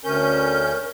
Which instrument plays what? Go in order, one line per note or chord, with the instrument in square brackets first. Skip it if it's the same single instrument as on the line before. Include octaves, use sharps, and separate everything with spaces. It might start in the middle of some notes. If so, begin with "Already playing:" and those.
[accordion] D2 C#4 G6 [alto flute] A#4